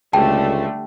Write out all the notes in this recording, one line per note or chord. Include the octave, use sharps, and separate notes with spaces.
C#2 D3 G3 A3 G5 A5